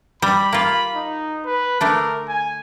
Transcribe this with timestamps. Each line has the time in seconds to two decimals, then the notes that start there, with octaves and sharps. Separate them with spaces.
0.22 G3 B5
0.53 A#3 F4
0.95 D#4
1.46 B4
1.81 D3 A3 D4 A#4
2.28 G#5